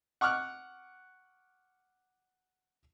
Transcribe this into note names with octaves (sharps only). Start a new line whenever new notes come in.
F#5 C#6 D6 F6 F#6